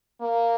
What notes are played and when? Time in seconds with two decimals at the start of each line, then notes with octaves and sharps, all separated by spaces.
0.20 A#3